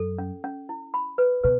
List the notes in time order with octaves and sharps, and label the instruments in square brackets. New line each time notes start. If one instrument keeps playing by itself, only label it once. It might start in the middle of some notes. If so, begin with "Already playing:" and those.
Already playing: [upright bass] F#2 [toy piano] A4
[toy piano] C#4
C#4
E4
B5
B4
[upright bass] B2 [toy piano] B4